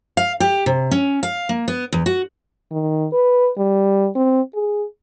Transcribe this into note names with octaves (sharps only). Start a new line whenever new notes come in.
F5
G4
C3
C#4
F5
A#3
B3
E2
F#4
D#3
B4
G3
C4
G#4